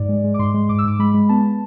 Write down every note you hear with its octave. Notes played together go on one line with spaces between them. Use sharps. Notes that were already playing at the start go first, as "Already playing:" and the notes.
Already playing: G#2 D5
G#3
G#3
D6
G#2 C6
G#3
G#2 D6
E6
G#2 D6
G#3 B5
G#3
B3 A5